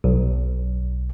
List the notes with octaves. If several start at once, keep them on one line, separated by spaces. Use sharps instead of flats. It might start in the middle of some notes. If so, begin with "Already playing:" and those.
B1